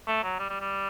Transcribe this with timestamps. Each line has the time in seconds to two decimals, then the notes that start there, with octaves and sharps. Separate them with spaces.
0.07 A3
0.23 F#3
0.39 G3
0.50 G3
0.61 G3